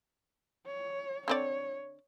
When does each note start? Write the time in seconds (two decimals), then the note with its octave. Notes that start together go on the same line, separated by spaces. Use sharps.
0.67 C#5
1.28 D3 C4 C#5 D5